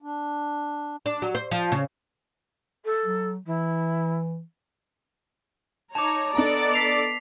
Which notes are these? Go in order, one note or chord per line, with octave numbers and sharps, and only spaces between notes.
D4
D4
F#3
C5
F3
C#3
A4
F#3
E3 E4
D#4 C#5 A5 A#5 D6
B3 D4 A4 D5 D#5 A#5
B6 C7 F7